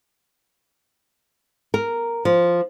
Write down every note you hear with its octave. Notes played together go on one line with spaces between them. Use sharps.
A#4
F3